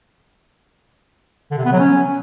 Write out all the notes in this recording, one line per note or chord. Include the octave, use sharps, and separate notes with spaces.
D3
C3
B3
F#3
C#4